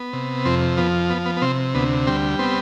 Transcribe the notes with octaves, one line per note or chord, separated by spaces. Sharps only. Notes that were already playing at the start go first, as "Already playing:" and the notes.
Already playing: B3
C3
F2 C4
F3 B3
B3
B3
B3
C3 C4
D2 B3
G3 C4
B3 C4